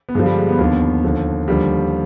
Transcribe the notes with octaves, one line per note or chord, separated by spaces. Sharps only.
B3
G2 D3 F3 G#3
G3
G#3
B3
D#2 D3 F3 B3
D#2 D3 F3
D#2 D3 F3 G3